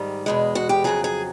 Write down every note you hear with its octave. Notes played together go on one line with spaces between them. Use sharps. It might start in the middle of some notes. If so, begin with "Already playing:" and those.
Already playing: G#2 D#3 G3
E2 B2 G#3
F#4
G4
F2 C#3 F#3 G#4
G#4